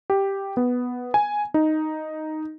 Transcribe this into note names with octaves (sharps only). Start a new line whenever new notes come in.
G4
B3
G#5
D#4